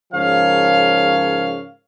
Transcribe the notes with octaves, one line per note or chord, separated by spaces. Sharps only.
G#2 C#3 F3 A#4 C#5 F5